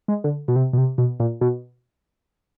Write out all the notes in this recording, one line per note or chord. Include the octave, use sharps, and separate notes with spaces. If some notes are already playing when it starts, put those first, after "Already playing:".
G#3
D3
B2
C3
B2
C3
B2
A#2
B2